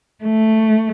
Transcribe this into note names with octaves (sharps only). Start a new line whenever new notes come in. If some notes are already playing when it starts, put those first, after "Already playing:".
A3